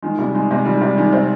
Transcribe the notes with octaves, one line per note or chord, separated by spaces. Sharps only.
D#3 G#3
C3 G3
D#3 G#3
C3 G#3
D#3 G3
C3 G3
D#3 G#3
C3 C4